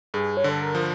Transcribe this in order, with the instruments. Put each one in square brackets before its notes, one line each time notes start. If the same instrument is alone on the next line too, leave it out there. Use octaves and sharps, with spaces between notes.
[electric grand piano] G2 [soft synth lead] G#4
[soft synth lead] C#5
[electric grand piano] D3 [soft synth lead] A4
[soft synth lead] A#4
[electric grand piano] F3